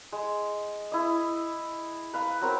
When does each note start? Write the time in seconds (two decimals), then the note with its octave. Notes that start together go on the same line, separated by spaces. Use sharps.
0.12 G#3
0.92 E4 D#5
2.14 B4 F5 A#5
2.42 F#3 C4 A#4